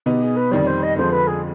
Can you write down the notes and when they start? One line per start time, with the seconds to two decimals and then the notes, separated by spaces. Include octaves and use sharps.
0.06 B2 B3 D#4 G4
0.22 G#4
0.36 B4
0.51 F2 D#3 G3 D5
0.66 C5
0.82 D#5
0.96 F2 D3 F3 G#3 C5
1.11 B4
1.27 G#4